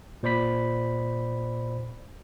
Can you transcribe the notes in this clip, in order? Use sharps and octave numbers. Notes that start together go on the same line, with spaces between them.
A#2 C5 D5 B5 B6